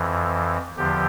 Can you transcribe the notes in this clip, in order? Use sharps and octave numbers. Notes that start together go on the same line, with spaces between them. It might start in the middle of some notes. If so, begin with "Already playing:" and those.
Already playing: F2 E3
E2 D3 F3 G4